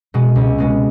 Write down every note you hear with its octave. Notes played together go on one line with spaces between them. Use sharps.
B2 G#3 B3
C#2
B2 G#3 B3